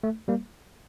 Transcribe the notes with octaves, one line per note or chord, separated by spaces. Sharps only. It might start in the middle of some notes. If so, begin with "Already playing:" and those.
A3
G3 A#3